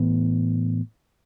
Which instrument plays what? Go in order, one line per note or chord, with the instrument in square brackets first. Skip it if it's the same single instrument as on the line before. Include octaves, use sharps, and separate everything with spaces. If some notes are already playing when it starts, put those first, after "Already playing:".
Already playing: [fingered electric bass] A2 E3 B3